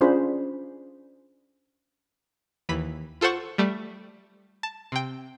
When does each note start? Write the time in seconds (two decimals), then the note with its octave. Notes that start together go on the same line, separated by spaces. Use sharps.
0.01 C#4 D4 F4 G#4 C5 B5
2.69 D#2 E3 B5 B6
3.21 F4 A4 C5 F#5 C#6
3.58 G3 A3 D5
4.63 A5
4.92 C3 G5